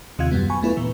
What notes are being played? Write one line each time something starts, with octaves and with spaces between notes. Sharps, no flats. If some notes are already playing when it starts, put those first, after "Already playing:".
D#2 C3 D#3 F4 F5 G#6
F#2 F#3 G3 B3
G#5 B5 C#6
A3 B3 E4 F4 B4
A#2 E3